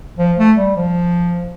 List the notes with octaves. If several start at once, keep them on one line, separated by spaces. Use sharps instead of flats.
F3
A3
G3
F3